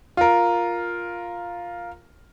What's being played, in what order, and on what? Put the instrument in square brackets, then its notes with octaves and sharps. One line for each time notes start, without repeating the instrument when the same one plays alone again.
[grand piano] F4 A#4